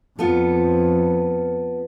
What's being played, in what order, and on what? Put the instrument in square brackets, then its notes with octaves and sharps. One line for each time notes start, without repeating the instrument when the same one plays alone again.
[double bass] F2 [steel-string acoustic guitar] B3 F4 A4